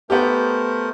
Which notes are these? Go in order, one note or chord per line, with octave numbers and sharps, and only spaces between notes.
A3 B3 G4 A#4 C5